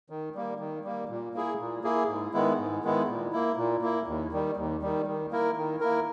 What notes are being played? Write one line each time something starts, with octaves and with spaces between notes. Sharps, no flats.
D#3
G3 A#3
D#3
G3 A#3
A#2
A#3 E4 G#4
A#2
A#3 E4 G#4
G#2
D#3 G#3 B3 E4
G#2
D#3 G#3 B3 E4
A#2
A#3 E4
A#2
A#3 E4
D#2
D#3 G3
D#2
D#3 G3
D#3
A#3 E4 A#4
D#3
A#3 E4 A#4